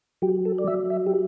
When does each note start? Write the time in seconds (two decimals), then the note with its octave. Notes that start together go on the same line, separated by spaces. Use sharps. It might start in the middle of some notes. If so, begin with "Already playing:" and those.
0.22 F#3 G4
0.45 A4
0.58 D5
0.68 F#3 E5
0.90 E5
1.06 G4